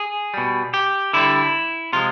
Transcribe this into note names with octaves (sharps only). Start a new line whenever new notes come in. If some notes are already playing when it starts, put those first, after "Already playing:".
Already playing: G#4
B2 G3
G4
D3 G3 E4
C3 F3 G#3 F4